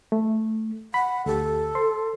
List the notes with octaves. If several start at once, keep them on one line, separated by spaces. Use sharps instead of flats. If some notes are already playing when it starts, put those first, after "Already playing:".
A3
F#5 B5
D2 G4 A4
C5 C6